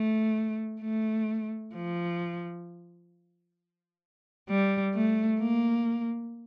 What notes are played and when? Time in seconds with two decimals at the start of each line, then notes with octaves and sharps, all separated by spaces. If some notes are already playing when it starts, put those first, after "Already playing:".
Already playing: A3
0.82 A3
1.74 F3
4.49 G3
4.95 A3
5.40 A#3